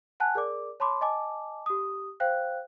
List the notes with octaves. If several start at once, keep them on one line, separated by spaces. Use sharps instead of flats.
F#5 G#5 A5 F#6
G#4 A#4 D5 D6
C#5 A5 B5 C6 D6
D#5 G#5 A5 D6
G4 D#6
C5 F5 G5 F#6